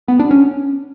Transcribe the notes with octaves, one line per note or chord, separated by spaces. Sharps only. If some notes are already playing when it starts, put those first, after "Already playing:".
B3
D4
C#4